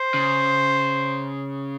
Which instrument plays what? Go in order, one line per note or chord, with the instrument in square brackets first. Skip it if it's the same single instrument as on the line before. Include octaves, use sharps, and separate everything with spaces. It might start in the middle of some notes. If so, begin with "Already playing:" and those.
Already playing: [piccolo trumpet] C5
[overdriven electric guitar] C#3